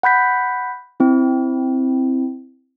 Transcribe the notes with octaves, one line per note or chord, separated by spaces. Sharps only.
F#5 B5 G6 B6
C4 E4